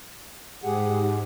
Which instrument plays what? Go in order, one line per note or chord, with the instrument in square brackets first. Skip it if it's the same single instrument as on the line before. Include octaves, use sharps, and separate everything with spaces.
[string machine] G#2 [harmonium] G4 G#4 F#5